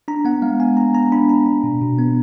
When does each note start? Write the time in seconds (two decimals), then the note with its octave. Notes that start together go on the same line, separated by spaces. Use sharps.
0.08 D4 A#5
0.25 B3 F#5
0.42 G#3 F5
0.60 B3 G#5
0.77 B3 A#5
0.94 B3 A#5
1.12 D4 B5
1.29 D4 A#5
1.46 D4
1.64 B2
1.81 B2
1.99 B3